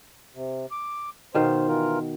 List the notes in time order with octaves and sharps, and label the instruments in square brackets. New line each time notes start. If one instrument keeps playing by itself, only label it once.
[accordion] C3
D6
[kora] B2 D#3 F5 [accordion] C5
[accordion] E3 F4 A#4